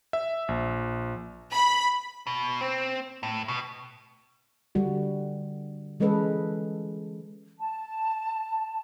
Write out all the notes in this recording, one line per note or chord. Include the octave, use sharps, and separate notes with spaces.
E5
A#1
B5
B2
C4
A2
B2
D3 G3 F#4
E3 G#3 C#4 A4 B4 D#5
A5